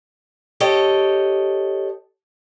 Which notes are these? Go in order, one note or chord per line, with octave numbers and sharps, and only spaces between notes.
G4 A4 C#5 D#5